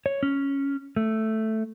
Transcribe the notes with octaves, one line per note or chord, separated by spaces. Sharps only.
C#5
C#4
A3